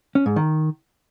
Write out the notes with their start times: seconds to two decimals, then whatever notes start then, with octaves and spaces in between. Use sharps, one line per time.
0.15 C#4
0.26 G#2
0.36 D#3